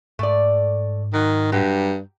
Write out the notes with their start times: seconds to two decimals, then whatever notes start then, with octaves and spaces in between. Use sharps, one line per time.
0.19 G#2 A3 D5
1.14 D#3 F#3
1.52 G2 F#3 G4